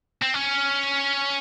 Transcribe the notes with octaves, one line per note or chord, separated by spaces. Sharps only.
C4
C#4